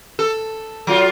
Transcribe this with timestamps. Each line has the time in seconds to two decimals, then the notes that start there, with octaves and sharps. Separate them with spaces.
0.19 A4
0.87 F#3 F4